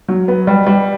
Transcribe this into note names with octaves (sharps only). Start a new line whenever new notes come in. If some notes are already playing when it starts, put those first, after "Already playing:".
F#3
B3
G3
G3